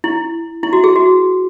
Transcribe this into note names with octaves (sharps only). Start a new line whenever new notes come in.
E4
E4
F#4
G#4
F#4